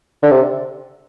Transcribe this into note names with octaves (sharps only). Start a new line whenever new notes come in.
D3
C3